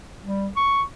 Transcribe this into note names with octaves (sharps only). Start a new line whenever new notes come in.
G3
C#6